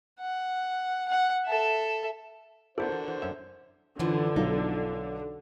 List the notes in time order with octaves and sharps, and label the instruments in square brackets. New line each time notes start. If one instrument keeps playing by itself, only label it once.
[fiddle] F#5
F#5
A4 E5
[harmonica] D3 F#4 [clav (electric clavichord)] B3 E4 D5 [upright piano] A4 A#4 [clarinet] C5
[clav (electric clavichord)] E3
[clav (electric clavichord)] E3 [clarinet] C5
[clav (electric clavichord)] F#2 C#4 E5
[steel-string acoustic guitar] F#2 F3 [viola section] D3 [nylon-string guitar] E3
[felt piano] B1 [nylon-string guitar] D#4